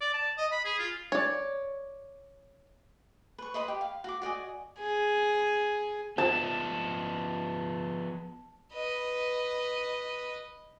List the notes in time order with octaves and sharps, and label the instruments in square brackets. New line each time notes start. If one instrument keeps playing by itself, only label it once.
[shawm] D5
A5
D#5
B5
G#4
F4
[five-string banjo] C#5 D5
[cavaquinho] B4 C#6
B4 D#5 B5 C6
G4
F5
F#4 D6
F#4 D5 D#5 G#5
[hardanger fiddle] G#4
[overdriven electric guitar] F3 B3 [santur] A5
[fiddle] B4 D#5